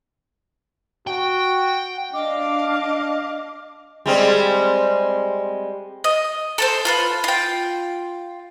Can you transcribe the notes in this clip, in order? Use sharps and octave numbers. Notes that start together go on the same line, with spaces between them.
F#4 G5
D4 D#5 F5 D6
G3 G#3 C4
D#5
A4 B4 C5
F4 A4 B4
F4 G5